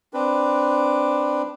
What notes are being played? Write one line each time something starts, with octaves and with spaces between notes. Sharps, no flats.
C4 D4 B4